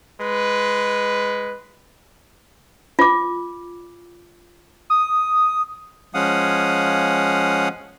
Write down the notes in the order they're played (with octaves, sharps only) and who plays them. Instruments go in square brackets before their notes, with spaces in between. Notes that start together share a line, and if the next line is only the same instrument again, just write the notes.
[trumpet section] G#3 B4
[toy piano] F4 D6
[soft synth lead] D#6
[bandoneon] F3 G#3 C#4 F5 F#5 D#6